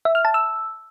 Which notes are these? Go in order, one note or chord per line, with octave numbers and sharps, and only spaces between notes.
E5
F6
A5
E6